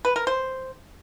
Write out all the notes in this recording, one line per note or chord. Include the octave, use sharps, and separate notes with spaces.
B4
A#4
C5